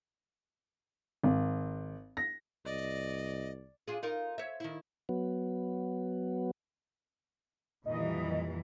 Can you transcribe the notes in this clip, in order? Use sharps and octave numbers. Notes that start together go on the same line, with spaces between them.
G#1
A#6
C2 D5 D#5
D4 F4 G#4
D#4 F4 A#4
C#5 E5
D#3 E4
F#3 B3
F2 A#2 D#3 E3 G3 D#5